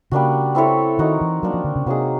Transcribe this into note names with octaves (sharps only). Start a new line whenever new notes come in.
C#3 G3 A#3 D4 F#4
C4 E4 A4 C#5
D#3 D#4 F#4 A#4
E3
F#3 A#3 D4 F#4
F3
D3
C#3
C3 F#3 A#3 D#4 G#4